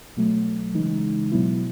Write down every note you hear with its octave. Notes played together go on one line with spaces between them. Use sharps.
B2 F#3 A3
C#3 E3 G#3 D#4
B2 F#3 B3 E4